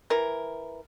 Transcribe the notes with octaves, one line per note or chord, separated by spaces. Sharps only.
E3 A#4